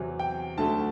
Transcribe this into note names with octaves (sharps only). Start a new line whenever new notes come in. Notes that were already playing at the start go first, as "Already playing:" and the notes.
Already playing: E2 C3 F#3
G5
D2 D3 F#3 A3 A5